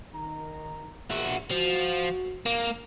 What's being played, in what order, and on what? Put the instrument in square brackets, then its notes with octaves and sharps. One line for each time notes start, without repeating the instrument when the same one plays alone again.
[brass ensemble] D#3 A#5
[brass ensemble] A#1 [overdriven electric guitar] E4 F#4
[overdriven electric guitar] F3 [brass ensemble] F#4
[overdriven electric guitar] A#3